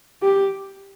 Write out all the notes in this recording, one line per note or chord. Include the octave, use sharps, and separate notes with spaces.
G4